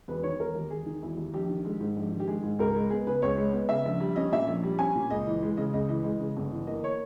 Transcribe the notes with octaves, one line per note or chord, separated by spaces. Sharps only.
E1 B4
D#3 C#5
E1 A#4
D#2
E1 G#4
D#3
E1 E4
D#2
A#1 G4
D#3
G#3
G#2
A#1
D#3
G4
G#3 G#4
G#2
C#2 A#4
G#3
B3 G#4
C#3 B4
C#2 C#5
G#3
B3
C#3 E5
A#1
G3
C#4 D#5
A#2 E5
A#1
G3
C#4 G#5
A#2
C#2 D#5
E3
G#3
C#3 D#5
C#2 D#5
E3 D#5
G#3
C#3
G1
E3
A#3 D#5
C#5